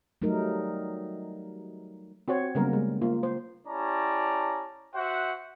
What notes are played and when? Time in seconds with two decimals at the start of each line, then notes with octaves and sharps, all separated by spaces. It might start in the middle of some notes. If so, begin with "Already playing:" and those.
0.22 F#3 G3 A3 D#4 A#4
2.28 C4 F#4 C5 C#5
2.55 C#3 F#3 G3 A#3 B3 A#4
2.73 G#3
3.02 A#3 F4
3.23 C5
3.68 C#4 E4 G4 D5 A5 A#5
4.95 F#4 C5 E5 F#5